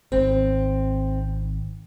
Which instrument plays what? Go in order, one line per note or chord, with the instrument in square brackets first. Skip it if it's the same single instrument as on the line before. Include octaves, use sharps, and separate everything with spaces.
[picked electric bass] G#1 [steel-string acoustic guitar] C4